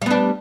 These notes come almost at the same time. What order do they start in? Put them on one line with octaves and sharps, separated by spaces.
G3 B3 D4